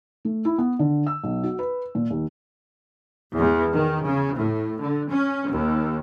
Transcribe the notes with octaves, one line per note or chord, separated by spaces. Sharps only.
A3
E4
B3
D3
E6
B1
F#4
B4
A#2
D#2
E2
D#3
C#3
A2
D3
C#4
D#2